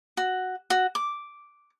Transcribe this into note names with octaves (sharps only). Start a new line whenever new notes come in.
F#4
F#4
D6